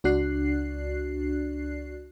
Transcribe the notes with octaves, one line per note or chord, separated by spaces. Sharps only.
C#2 D4 F#4 D5 F#6 C7